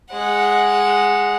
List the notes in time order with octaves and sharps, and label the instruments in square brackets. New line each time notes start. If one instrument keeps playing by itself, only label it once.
[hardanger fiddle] G#3 F#5